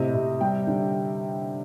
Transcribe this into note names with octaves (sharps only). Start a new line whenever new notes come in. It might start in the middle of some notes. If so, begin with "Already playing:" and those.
Already playing: A2 C3 D#5
C3
G3 G5
D3